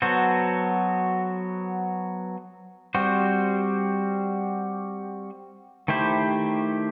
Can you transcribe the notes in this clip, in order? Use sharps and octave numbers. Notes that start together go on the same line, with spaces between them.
F#3 B3 F#4 A4 C5
G3 C4 F#4 C5
D#3 A3 E4 G4 C5